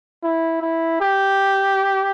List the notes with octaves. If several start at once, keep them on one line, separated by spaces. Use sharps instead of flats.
E4
E4
G4